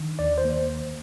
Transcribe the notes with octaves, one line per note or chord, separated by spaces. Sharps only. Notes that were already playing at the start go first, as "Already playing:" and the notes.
Already playing: D#3 D4
D#2 D5
C5
A#3